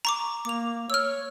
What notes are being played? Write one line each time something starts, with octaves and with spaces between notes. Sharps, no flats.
A#5 C#6 D6
A#3 D6 F7
C#5 E6 F6